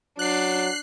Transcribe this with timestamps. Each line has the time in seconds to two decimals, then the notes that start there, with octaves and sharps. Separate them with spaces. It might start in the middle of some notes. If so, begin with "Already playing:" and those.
0.19 F#3 D4 F#6 C7